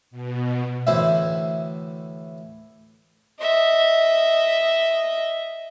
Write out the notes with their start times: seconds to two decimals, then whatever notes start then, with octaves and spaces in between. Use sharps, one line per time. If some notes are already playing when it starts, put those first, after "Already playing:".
0.11 B2
0.87 D2 A2 E3 E4 C5 E5
3.40 D#5 E5